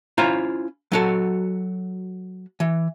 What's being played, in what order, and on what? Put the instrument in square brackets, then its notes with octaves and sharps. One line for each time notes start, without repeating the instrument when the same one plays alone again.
[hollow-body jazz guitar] C#4 E4 F4 C5 A#5
F#3 F#4 A4
E3